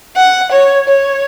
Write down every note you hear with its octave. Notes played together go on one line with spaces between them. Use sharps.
F#5
C#5
C#5